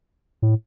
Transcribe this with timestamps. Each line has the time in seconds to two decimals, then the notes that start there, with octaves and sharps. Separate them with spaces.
0.42 A2